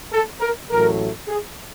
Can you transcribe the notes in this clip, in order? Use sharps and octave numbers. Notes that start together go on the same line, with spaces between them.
A4
A#4
A1 A2 F#3 A3 A#4
G#4